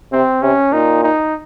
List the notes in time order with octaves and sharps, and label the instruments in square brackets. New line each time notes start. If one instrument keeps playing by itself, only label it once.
[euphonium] C3 [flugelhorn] C4
[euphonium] C3 [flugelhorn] C#4
[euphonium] A#2 [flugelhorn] D#4
[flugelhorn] D#4